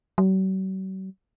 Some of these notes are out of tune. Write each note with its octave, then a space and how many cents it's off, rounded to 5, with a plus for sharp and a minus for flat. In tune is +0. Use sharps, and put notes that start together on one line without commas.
F#3 +45